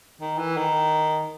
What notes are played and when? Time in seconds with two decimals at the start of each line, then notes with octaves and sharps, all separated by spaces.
0.21 D#3
0.38 E3
0.57 D#3